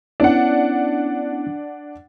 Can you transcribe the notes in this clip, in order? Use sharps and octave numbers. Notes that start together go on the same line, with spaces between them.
B3 C#4 D4 E4 F#5